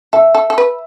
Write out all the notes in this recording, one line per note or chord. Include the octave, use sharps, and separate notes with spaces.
A4 E5
A4
A4
B4